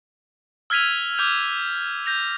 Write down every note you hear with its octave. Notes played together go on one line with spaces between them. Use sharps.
E6 F6 G#6 B6 D#7 F7
D6 F6 G6 F7
G6 A#6 F7